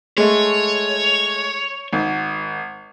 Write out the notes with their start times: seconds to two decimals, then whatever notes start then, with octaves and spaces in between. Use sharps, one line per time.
0.17 G#3 A3 C#5
1.93 G#1